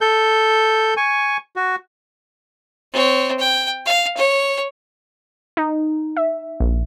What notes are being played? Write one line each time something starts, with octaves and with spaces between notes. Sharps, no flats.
A4 G6
G#5 C#6
F#4
C4 C#5
G5
F5
C#5
D#4
E5
A#1